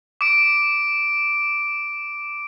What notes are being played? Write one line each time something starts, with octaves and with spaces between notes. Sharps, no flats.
D6 D7